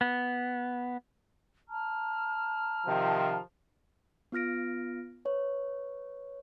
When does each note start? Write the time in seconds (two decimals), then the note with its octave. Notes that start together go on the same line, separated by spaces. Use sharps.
0.01 B3
1.69 A5 A#5 F6
2.86 C3 D#3 F3
4.32 B3 F4 F6 A#6 D7
5.25 B4 C#5